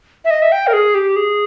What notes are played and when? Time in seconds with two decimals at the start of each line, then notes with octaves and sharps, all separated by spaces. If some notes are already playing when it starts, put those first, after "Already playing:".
0.25 E5
0.31 D#5
0.42 E5
0.52 G5
0.67 A#4
0.73 G#4
0.95 G4
1.16 G#4